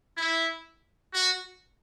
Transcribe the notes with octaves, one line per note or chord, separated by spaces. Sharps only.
E4
F#4